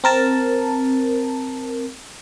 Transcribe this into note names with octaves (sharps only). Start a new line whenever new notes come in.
C4 A#4 A5